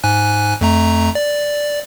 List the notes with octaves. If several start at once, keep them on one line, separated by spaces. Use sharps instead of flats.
G#2 G#5 F#6
F2 A3 A#5
D5